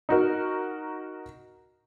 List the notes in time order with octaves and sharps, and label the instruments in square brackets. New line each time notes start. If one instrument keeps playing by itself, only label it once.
[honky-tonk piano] D#4 F#4 A#4